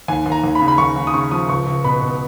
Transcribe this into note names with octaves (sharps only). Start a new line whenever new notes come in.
D#2 G#5
D#2
A#5
D#2
B5
C#3
B5
D#2 C#6
D#2
D#6
C#3 C#6
F3 D#6
C#2 C#6
C#2
B2 B5
B2